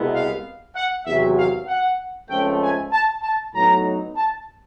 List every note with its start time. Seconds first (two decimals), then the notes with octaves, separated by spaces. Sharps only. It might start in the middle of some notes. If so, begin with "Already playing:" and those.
Already playing: C2 B2 G#3 B3 E4
0.14 F5
0.76 F#5
1.06 E2 C3 D#3 F#3 E5
1.37 F5
1.68 F#5
2.30 C#2 C#3 F3 A3 C4 G5
2.62 G#5
2.92 A5
3.22 A5
3.54 A2 F#3 B3 D#4 A#5
4.16 A5